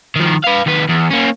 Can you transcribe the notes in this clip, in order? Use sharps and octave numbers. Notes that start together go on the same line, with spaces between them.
D#3 F3
B4 F5
D#2 B4
E2
A#3 C#4